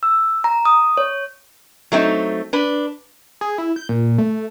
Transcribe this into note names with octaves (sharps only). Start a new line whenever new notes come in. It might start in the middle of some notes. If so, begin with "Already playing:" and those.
E6
A#5
D#6
C#5
F#3 A3 C4 D#4
D4 B4
G#4
E4
G6
A#2
A3